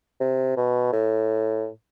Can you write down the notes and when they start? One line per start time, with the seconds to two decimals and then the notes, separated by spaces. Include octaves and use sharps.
0.20 C3
0.57 B2
0.93 A2